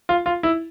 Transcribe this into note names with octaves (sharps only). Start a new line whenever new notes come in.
F4
F4
E4